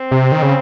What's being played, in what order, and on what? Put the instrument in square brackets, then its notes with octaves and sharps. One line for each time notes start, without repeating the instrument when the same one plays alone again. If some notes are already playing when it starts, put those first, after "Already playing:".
Already playing: [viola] C4
[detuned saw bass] C3
D#3
C#3